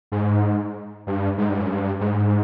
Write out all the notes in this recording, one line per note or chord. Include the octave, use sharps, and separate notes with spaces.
G#2
G2
G#2
G2
F#2
G2
G#2